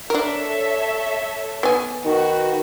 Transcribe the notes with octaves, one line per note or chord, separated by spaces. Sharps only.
D4 A4 A#4 C#5 E5
B3 G#5
D#3 F#4 B4